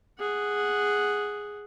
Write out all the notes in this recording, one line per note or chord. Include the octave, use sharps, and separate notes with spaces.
G#4 F#5